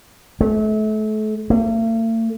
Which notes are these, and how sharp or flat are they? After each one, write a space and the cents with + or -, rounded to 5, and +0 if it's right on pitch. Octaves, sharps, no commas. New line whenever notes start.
A3 -35
A3 +45